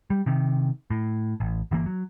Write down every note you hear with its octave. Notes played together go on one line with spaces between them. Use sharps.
G3
C3 D#3
A2
A1
G1 E3 A#3
F#3